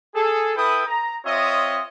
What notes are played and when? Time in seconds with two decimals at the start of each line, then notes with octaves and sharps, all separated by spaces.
0.15 G#4 A4
0.56 E4 A4 B4 G5 D#6
0.86 A#5
1.25 C4 F4 C#5 D#5 E5 D#6